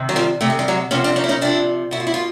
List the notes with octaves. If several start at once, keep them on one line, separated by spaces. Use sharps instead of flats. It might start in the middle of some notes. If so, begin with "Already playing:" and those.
Already playing: C3 D#3
F#3
F3 G3
C3 D#3 A3
G#3
G3
F#3 G#3
C3 F3 B3 C#4
C4 D4
C#4 D#4
E4
C#4 D#4
C3 F3 D4 E4
B2 E4
F4
E4
F4